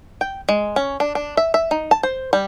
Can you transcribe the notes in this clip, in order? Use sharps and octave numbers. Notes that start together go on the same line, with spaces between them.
G5
G#3
C#4
D4
D4
E5
E5
D#4
A5
C5
G3